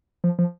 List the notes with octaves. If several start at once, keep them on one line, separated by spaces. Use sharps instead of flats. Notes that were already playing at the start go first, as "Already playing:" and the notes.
F3
F3